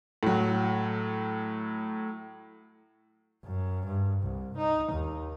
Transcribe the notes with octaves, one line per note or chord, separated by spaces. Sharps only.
A2 F#3
F#2
G2
C2
D#4
D#2